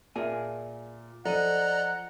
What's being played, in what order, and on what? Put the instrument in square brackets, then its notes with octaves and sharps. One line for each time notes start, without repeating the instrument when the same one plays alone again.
[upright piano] A#2 E5 F6 [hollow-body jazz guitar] G#4 A#4 G#5
[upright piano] F3 D#7 [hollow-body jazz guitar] A4 [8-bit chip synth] D5 D#5 A#5 [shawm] F#5